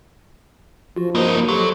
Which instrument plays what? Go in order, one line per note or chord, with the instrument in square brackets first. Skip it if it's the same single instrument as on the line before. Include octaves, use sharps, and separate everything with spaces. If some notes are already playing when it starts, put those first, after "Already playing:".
[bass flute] F3 [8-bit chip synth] F4 F#4
[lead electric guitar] G2 D#4 [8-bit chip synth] A#3 A#4 C5
[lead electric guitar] F#3 [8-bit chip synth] G4 C6 [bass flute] A4